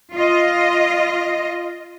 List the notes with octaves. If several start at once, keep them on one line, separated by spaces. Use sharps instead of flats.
F4 D#5